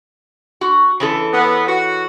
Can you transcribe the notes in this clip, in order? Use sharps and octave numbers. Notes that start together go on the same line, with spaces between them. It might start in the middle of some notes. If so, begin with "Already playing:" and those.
F#4
C#3 E3 A4
B3
F#4